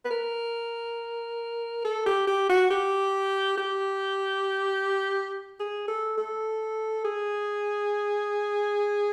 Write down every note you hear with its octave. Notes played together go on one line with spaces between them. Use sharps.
B4
A#4
A4
G4
G4
F#4
G4
G4
G#4
A4
A4
G#4